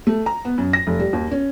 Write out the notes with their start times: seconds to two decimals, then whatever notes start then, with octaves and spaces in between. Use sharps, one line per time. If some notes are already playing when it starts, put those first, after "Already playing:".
0.07 A3
0.26 A#5
0.45 B3
0.58 F#2
0.73 A#6
0.87 F1
1.00 G3
1.13 D#2
1.31 C#4